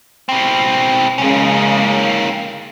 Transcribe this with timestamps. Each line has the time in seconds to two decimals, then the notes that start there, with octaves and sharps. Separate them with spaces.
0.29 B2 C4
1.18 C#3 G#3 A#3 C#4